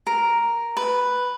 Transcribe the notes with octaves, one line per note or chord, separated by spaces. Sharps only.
A#4
B4